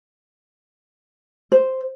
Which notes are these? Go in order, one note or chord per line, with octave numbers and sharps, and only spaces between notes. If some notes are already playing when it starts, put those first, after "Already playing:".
C5